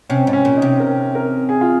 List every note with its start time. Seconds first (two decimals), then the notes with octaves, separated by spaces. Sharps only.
0.09 C3 C#4
0.27 G#2
0.33 C#4
0.45 A#2
0.57 D#4
0.62 C3
0.80 A#4
1.15 A#4
1.49 G#4
1.61 F4